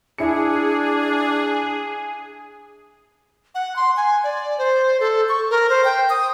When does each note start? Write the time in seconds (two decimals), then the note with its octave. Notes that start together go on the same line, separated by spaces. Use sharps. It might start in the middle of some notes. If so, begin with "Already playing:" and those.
0.18 D4 E4 G#4 C#7
3.55 F#5
3.76 C6
3.97 G#5
4.24 D5
4.58 C5
5.00 A4
5.29 C#6
5.50 A#4
5.70 C5
5.85 G5
6.10 D#6